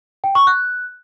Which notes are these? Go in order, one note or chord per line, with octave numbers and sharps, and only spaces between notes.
G5
C#6
F#6